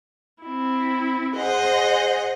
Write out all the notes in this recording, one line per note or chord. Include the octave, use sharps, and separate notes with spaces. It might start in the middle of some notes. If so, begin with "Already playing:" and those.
C4 E4
G#4 C5 D#5 F#5